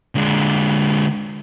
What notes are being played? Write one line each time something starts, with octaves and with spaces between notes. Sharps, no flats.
D3 G#3